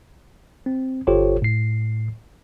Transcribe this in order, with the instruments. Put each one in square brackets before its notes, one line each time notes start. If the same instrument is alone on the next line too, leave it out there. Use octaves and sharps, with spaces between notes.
[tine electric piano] C4
G1 F4 G4 A4 C5 C#5
A2 C7